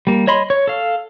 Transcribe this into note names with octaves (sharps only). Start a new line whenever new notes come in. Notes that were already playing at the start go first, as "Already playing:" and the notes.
G3 A#3
C#5 D#5 B5 C6
C#5
A4 F5